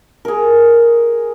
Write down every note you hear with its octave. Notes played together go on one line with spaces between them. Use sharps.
G#4 A#4